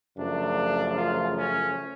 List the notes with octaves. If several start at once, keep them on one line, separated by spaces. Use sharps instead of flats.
F#2 C#3 F3 A3 D4
F4
C#4